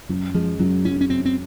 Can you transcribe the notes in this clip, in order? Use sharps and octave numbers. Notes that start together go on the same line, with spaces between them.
F#2 F#3
F3 G#3
F#2 F#3
F#2 C#4
C#4
F#2 C4
C4